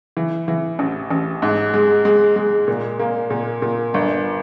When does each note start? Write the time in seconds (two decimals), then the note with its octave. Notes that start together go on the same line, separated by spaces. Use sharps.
0.17 E3
0.48 E3
0.79 A1
1.10 A1
1.42 G#2
1.74 G#3
2.05 G#3
2.36 G#3
2.68 A#2
2.99 A#3
3.30 A#2
3.62 A#2
3.94 G1